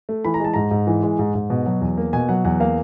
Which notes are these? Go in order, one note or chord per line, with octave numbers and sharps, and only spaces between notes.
A3
E3 B5
A#5
G#3 A5
G#2 A#5
G#2
E3
G#3
G#2
G#2
B2
F#3
E2
A#3
B2 G#5
F#3 F#5
E2 F#5
A#3 F5